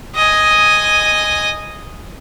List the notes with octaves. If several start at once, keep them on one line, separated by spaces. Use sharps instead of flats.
D#5 G#5